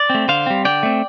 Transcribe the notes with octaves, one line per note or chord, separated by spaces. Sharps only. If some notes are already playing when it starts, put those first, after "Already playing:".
Already playing: D5
A3 C4
D3 C5 F5
G3 C4
D3 D5 G5
A3 C4